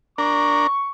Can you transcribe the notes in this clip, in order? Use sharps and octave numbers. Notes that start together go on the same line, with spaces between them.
D4 A#4 C#6